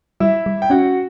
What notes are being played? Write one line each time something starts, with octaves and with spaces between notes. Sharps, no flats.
G3 E4 E5
G3
G5
C#4 F#4 F#5